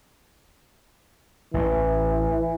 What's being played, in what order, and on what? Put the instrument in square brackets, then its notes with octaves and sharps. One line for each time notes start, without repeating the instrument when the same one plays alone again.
[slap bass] A1 A2 [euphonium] E3